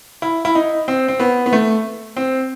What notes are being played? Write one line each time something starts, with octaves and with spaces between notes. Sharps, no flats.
E4
E4
D#4
C4
C4
B3
B3
A3
C4